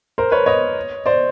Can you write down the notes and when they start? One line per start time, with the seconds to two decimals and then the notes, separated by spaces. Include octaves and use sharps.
0.18 A#4 C5
0.32 B4 C#5
0.46 C#5 D#5
1.06 C5 D5